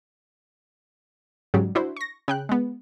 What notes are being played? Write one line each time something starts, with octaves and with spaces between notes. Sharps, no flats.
G#2 C#3 F#3 G3
D4 E4 F#4 C5
C#6 A#6
C#3 G5 F#6
G#3 B3